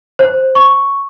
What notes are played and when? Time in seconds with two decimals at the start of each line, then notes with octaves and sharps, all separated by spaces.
0.19 C5
0.55 C#6